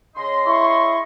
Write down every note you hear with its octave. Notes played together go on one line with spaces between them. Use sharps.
C#3 D#5 C6
E4 C#6